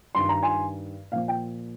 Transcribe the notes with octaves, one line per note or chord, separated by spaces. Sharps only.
G2 D#3 C6
A#5
G#5 C6
A#2 F3 F5
G5